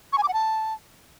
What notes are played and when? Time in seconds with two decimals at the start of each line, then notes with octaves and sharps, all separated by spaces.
0.13 C#6
0.18 G#5
0.23 D6
0.28 F#5
0.33 A5